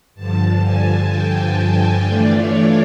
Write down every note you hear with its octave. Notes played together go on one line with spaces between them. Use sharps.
G2 D3 F3 A5
G#5
G5
E3 A3 D4 F4 D5
C#5